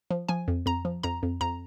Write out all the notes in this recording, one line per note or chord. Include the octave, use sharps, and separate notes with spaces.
F3
F3 G#5
F2
F2 A#5
F3
F2 A#5
F2
F2 A#5